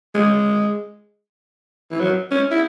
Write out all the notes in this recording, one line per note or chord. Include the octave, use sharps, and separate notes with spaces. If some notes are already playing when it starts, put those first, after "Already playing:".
G#3
E3
F#3
C#4
E4